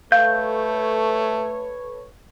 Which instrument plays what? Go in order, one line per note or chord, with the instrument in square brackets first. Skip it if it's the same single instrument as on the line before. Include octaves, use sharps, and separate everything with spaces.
[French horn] A3 [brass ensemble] A4 B4 C#5 [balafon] F5 [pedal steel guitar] G6